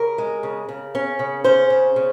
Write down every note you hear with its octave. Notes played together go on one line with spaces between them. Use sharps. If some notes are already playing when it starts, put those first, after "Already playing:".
Already playing: C#3 A#4
G#3
C#3
C#3
C#4
C#3
C#4 C5
C#3
C#3